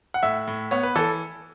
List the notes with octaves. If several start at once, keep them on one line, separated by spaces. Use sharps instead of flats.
F#5
A2 E5
A2
B3 C#5
B4
E3 A4